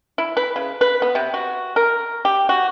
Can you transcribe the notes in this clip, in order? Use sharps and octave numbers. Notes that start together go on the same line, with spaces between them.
E4
B4
C#3
B4
B3
C3
F#4
A#4
G4
F#4